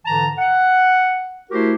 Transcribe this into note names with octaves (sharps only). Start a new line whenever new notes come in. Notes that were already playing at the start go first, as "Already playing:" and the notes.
G#2 D3 E3 A5 A#5
F#5
A3 E4 F#4 G4 A#4 C5